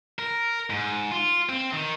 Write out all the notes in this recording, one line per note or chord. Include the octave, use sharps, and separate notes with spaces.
A#4
G#2
F4
C4
D#3